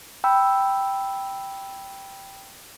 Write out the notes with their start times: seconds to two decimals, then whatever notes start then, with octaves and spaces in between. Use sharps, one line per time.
0.24 G5 B5 E6